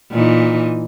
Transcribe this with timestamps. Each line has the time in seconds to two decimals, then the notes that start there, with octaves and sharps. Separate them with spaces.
0.11 A#2 E3 D#4